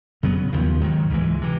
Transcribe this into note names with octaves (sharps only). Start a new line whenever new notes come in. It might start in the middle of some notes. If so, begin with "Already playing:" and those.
F2 C#3 F#3 B3
D#2 C#3 F3
G#2 D#3 F#3
C#2 C3 E3 G#3
C3 E3